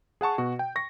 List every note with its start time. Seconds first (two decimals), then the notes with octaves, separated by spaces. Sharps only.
0.21 G#4 F#5 A5 C#6
0.38 B2 F#4
0.59 G5
0.76 C#6 A#6